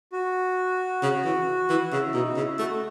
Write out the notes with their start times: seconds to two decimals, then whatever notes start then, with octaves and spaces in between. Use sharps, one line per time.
0.12 F#4
1.02 C#3
1.24 E3
1.69 E3
1.91 C#3 E4
2.13 B2 D#4
2.28 F#4
2.36 C#3 E4
2.59 A3 F#4